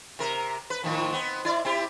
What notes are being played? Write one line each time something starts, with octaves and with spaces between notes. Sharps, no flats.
C3 A#4
B4
A2 D#3 F3
B3 C4
E4 D5
C4 E4 G4